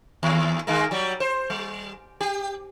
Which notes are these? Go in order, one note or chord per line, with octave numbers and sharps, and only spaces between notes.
D#2
D#3 G#3 A#3
F#3 G3
C5
G3
G4